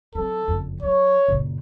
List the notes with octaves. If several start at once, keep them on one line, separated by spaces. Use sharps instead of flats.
F#3 C4 A4
F#1 F2
F#3 C#5
F#1 A#2